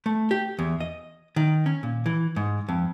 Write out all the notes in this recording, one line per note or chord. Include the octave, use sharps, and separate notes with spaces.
A3
G4
E2
D#5
D#3
C#4
A#2
E3
G#2
F2